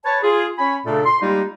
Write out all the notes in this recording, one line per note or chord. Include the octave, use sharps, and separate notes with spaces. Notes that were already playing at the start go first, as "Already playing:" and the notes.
B4 C#5 A5
F4 G#4
C#4 C#5 G#5 B5
A#2 C#3 A3 D4 A4
C6
G3 G#3 A#3 D#4 F4 G4